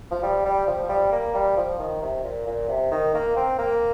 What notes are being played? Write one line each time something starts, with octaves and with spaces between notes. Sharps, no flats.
F3
G3
G3
F3
G3
A#3
G3
F3
D#3
C3
A#2
A#2
C3
D#3
A#3
C4
A#3